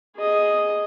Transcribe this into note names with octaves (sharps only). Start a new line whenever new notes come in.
G#4 D#5